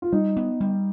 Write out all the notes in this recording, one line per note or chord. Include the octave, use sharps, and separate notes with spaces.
F4
G3 D#4
B3
G3